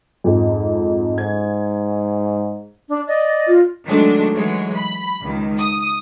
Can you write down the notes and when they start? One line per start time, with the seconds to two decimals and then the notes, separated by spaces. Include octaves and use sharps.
0.24 F2 G#2
1.18 G#2 G#6
2.89 D4
3.07 D5 D#5
3.47 F4
3.85 D#3 F#3 G#3 A3 D4
4.33 E3 F#3 G#3 C#5
4.74 B5
5.21 C#2 D#3
5.58 D#6